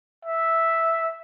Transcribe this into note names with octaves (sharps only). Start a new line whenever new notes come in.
E5